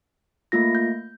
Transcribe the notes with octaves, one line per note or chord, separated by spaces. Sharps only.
A3 A#3 F4 A#6
G6